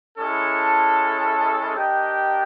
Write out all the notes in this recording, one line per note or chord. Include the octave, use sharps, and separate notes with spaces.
G#3 C#4 E4 A4
D4 G4 A#4 D#5 G5